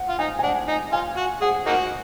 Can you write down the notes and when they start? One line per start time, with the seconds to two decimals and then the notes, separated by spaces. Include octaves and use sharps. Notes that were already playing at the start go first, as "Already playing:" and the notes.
Already playing: F#5
0.09 F4
0.19 D#4 G#5
0.39 G#5
0.43 D4 F#5
0.68 D#4
0.93 F4 G#5
1.17 F#4
1.41 G#4 F#5
1.66 A#3 D#4 F#4 F#5